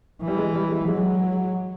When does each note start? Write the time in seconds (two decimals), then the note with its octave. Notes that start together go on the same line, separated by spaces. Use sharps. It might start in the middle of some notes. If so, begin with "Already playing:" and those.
0.22 E3
0.28 G3
0.38 G#3
0.55 G3
0.71 G#3
0.88 F#3 G#3